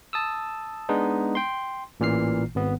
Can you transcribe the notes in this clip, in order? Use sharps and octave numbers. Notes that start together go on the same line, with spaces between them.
A5 D#6 E6
G#3 B3 D4 D#4
G5 C6
A1 A#2 E3 F6 C7
G#1 B3